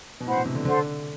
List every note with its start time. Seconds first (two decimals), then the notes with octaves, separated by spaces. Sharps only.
0.21 B2
0.26 A2 C5 F#5 B5
0.37 B2
0.46 C3
0.55 D3
0.65 D3 A4 C5 F#5 C6